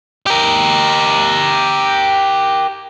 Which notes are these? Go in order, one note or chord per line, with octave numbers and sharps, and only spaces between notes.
G4 A#4